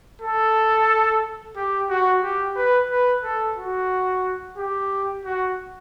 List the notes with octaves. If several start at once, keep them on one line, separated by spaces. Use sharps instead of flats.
A4
G4
F#4
G4
B4
B4
A4
F#4
G4
F#4